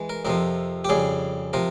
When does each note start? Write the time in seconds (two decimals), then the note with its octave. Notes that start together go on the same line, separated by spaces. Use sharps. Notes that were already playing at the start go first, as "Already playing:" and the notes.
Already playing: E3 G#3
0.09 A#4
0.25 F2 C3 F3 A#4
0.85 G4
0.89 F2 C#3 G3 G#4
1.53 C3 F3 A#4